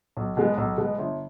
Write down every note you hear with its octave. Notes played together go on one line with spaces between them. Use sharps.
B1
B2 G#3 B3
B1
B2 G#3 B3
G1